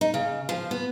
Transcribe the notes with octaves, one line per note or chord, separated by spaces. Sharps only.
D#4
C#3
F3
B3